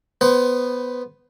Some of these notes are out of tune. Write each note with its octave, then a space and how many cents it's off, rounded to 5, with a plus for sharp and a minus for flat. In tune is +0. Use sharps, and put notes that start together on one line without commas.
B3 +0 C5 +0 F#5 +30